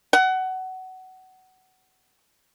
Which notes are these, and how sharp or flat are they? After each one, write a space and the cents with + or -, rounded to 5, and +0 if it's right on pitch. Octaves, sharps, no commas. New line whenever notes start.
F#5 +20